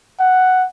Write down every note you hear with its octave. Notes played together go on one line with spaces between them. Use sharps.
F#5